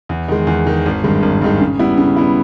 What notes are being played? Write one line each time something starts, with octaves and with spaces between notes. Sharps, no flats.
E2
D#3 G#3
E2
D#3 G#3
G#1
G2 D#3 G#3
G#1
G2 D#3 G#3
C#3
G3 B3 E4
C#3
G3 B3 E4